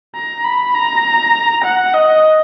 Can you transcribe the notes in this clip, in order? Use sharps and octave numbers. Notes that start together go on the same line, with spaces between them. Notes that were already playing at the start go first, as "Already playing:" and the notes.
A#5
B5
A#5
F#5
D#5